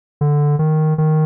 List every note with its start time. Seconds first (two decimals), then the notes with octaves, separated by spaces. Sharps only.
0.21 D3
0.59 D#3
0.98 D#3